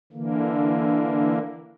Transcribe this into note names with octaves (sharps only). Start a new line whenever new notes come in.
D3 E3 A#3